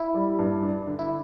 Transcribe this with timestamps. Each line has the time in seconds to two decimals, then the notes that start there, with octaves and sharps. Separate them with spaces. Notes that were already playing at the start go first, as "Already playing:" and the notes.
Already playing: E4
0.14 G3
0.39 G2
0.63 D4
0.87 D3
0.99 E4